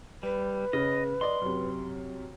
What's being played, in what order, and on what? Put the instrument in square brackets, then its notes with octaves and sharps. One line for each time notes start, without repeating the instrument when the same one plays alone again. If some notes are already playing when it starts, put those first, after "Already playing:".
[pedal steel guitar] G3 [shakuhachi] B4
[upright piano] C#3 [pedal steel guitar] D#5
[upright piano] D5 D#5 [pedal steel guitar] C6
[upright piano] F#2 C3